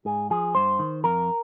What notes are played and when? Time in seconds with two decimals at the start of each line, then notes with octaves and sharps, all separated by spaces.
0.05 G#2 G#4
0.30 F3 G#4
0.55 G2 C5
0.79 D#3
1.04 F2 A#4